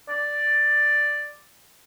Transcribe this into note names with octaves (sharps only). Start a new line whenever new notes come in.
D5